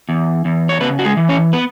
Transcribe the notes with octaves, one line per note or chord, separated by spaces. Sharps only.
E2
E2
C#5
C#3 B3 B4
F#4
G#3 G#4
E3
C#4 C#5
B3 B4